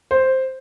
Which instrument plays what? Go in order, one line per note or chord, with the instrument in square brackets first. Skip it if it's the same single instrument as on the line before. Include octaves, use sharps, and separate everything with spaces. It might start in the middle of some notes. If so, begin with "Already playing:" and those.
[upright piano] C5